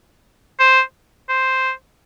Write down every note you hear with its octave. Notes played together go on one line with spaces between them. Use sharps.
C5
C5